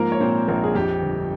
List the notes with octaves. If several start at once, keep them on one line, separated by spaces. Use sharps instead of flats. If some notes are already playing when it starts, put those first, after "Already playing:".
Already playing: G#2 F3 A#3 A#4
C#5
A#2 C4 C5
A#1 A#3 A#4
G#4
F2 G4
G1